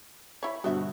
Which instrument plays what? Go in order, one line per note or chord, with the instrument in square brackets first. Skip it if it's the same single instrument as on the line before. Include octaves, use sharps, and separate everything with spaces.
[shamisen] E4 C#5 [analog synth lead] B5
[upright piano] G2 B2 D3 [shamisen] B3 C5 E5 [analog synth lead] F#4